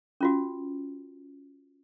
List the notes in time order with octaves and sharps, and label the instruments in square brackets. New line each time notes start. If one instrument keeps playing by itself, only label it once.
[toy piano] C#4 F4 F#4